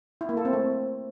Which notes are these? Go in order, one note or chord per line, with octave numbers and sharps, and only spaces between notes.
E4
A#3
A4
C4
A3